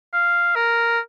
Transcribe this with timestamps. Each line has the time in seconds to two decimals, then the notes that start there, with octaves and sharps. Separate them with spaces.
0.14 F5
0.55 A#4